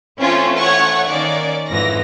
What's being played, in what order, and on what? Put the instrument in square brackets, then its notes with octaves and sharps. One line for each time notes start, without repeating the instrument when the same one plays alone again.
[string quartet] E3 A3 [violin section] C4 C#4 F4
[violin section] C#5 F#5 C#6
[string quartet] D#3 A#3 C#4 [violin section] D5
[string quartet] F2 G#2 E3 [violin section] A#6